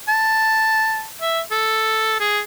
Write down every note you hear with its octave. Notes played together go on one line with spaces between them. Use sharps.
A5
E5
A4
G#4